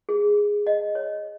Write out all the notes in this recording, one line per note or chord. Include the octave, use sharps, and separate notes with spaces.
G#4
D#5
C#5